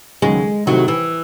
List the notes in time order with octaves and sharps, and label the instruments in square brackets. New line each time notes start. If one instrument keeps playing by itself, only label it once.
[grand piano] D#2 C#3 F#3 [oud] G#3
[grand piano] C2 C3 D#3 A3 D#4 [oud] F#3
[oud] E3